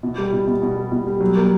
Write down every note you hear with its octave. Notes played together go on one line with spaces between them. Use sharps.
B2
G3
B2
B2
B2
G3
B2
G3
F#3
A#3